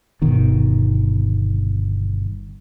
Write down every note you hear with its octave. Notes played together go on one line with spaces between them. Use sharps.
G1 B2 D#3